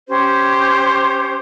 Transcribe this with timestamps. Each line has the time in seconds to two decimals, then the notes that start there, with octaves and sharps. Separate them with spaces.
0.09 C#4 G4 C5